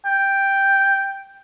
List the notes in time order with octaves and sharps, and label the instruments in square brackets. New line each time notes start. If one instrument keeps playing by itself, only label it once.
[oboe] G5